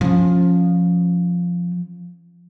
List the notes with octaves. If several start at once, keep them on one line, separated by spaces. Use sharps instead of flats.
F3 C#4